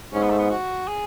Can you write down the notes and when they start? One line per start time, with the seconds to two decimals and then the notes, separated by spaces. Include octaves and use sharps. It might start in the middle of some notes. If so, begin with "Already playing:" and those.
0.13 G#2 C#4
0.22 B3
0.30 A3
0.38 B3
0.50 F#4
0.88 G#4